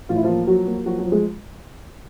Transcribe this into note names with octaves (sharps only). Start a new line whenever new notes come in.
A1 F4
E4
F3 A#3 F4
F3 F#3 F#4
A#3
F3 F#3 F#4
F#3 F#4
F3
G#3 G#4